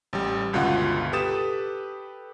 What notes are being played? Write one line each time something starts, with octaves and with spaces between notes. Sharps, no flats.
A1 G3
G1 C#2 B2 F4 F#5
G4 A4 B4 D#6 A6 E7